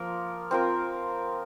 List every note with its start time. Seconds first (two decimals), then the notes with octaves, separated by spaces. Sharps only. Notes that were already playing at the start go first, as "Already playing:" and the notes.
Already playing: F3 A#3 F4 A#4
0.51 C4 F4 A#4